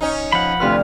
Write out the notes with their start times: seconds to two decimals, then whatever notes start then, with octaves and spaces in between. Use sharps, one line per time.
0.01 C#4 D#4
0.32 F3 F#5 B5
0.60 D2 C3 F4 B4 F6